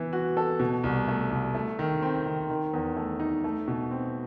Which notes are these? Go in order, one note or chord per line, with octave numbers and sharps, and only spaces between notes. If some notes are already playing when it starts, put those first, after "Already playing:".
Already playing: E3 B3
F#4
A4
B2
C2
A3
C2
A3
D#3
C4
D#3
D#3
E2
A3
D#4
A3
B2
C4